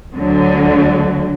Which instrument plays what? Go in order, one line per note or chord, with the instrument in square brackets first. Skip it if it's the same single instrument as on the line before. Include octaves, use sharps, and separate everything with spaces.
[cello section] D2 D3 F#3